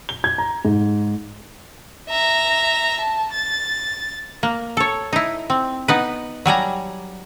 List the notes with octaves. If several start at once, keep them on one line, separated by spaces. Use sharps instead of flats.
G7
G#6
A#5
G#2
E5 A#5
A5
A6
A#3
A4 C#5
D#4 E4
C4
B3 D#4 B4
F#3 G3 G#5 A#5